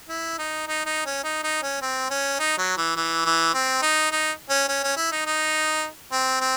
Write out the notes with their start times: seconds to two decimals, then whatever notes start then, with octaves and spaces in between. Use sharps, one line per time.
0.09 E4
0.38 D#4
0.67 D#4
0.86 D#4
1.06 C#4
1.24 D#4
1.43 D#4
1.62 C#4
1.81 C4
2.10 C#4
2.39 D#4
2.58 F#3
2.77 E3
2.96 E3
3.25 E3
3.54 C4
3.82 D#4
4.11 D#4
4.49 C#4
4.68 C#4
4.83 C#4
4.96 E4
5.12 D#4
5.26 D#4
6.12 C4
6.40 C4